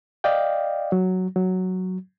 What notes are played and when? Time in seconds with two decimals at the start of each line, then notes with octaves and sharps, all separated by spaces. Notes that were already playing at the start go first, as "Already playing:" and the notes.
0.24 D5 D#5 F5 G5
0.92 F#3
1.36 F#3